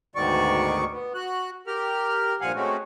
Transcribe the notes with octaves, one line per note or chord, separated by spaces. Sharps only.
D2 G#2 B2 D#3 D5 C#6
B3
F#4 F#6
G4 A#4 F6
G2 A#2 F3 F5 F#5 G#5
G#3 A3 C4 C#4 F#4